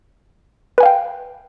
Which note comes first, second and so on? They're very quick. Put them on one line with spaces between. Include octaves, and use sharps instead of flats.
B4 G#5 F5 G5